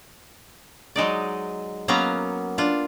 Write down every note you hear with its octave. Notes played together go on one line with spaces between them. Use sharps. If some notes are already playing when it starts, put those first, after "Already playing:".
F#3 G#3 D#4 D5
F#3 A#3 B3 C#4 F5 A#5
D4 F4